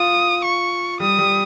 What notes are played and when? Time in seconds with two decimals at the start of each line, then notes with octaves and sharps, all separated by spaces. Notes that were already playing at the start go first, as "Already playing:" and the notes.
Already playing: F4 D#6
0.45 C#6
1.00 G3 D#6
1.19 G3